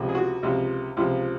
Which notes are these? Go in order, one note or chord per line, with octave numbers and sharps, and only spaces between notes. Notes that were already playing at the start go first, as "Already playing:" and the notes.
Already playing: C#2 C3 F3
G#4
F#4
C#2 C3 F3
C#2 C3 F3